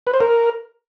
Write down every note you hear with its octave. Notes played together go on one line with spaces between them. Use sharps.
B4
C5
A#4